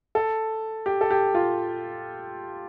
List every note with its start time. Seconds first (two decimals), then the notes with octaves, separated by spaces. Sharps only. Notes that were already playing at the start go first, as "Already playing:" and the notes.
0.15 A4
0.86 G4
1.01 A4
1.11 G4
1.35 F4